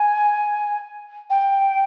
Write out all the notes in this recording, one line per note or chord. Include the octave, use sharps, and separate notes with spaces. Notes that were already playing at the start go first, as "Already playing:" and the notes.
Already playing: G#5
G5